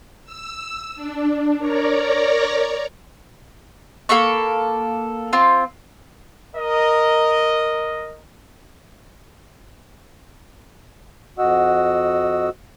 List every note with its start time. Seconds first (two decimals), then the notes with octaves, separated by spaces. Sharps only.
0.25 E6
0.95 D4
1.59 A#4 C#5 D5 A#5
4.09 A#3 A4 B5 C#6
5.33 C4 F4
6.56 A#4 D#5
11.39 F2 F#4 D#5 F#5 E6